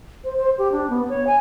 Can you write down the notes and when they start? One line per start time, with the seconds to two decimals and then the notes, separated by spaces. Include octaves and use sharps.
0.24 C5
0.37 C5
0.58 G4
0.72 D4
0.89 B3
1.09 C#5
1.27 G#5